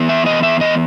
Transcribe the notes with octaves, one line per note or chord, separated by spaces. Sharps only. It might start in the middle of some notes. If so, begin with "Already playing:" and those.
Already playing: E3 B3
E5
D#5
E5
D#5